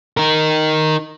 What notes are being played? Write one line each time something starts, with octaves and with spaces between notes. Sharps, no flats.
D#4 A#4